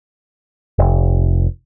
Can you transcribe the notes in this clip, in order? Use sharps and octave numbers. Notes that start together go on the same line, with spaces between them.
F1